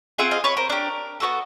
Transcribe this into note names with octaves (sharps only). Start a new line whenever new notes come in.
C4 F4 G#4 E5 F#5
D#5 F5
B4 C#5
A#4 C5
D4 G4 A#4
B3 D4 F#4 A4